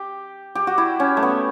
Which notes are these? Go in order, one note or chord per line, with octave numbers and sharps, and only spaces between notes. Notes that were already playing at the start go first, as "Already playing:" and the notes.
Already playing: G4
G4
F#4
E4
C#4
A3
B3